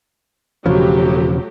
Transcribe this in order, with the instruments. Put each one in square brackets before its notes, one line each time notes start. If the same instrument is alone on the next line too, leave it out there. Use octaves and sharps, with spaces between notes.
[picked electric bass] E1 C#3 F3 [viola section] F#3 A3 G4